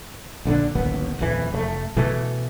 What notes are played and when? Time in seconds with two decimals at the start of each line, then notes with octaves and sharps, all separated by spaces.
0.45 A#1 D3 G3 D4
0.75 D1 A1 D#2 B3
1.19 D#1 F2 E3
1.52 F1 C#3 A3
1.97 B2 E3 A3